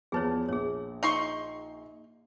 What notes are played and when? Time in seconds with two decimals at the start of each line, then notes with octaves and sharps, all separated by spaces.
0.12 E2 F3 G#4 B4 C#5 A5
0.49 A#1 G#4 C#5
1.03 D#4 C6 C#6